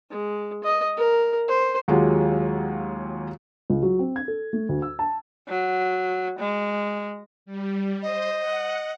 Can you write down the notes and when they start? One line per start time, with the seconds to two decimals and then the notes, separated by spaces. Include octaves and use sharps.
0.10 G#3
0.64 D#5
0.97 A#4
1.48 C5
1.88 D#2 F#3 G#3 F4 G4 F#5
3.70 C#2
3.83 F#3
3.99 C4
4.16 G#6
4.28 A4
4.53 A3
4.69 D2
4.82 E6
4.99 A5
5.48 F#3
6.39 G#3
7.46 G3
8.02 C5 D#5
8.39 F#5